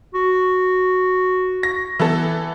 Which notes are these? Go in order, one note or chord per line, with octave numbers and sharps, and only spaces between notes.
F#4
A#6
E3 B3 A4